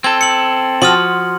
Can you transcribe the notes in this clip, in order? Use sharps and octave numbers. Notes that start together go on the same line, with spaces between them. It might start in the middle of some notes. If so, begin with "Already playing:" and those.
C4 A4 G#6
C#7 F#7
F3 F#4 C6 D#6 F6